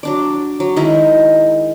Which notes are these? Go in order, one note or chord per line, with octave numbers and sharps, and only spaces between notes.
F#3 D4 D5
F#3
D#3 G#3 D#4 E4